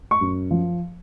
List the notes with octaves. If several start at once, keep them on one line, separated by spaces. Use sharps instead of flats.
C#6
F#2
F3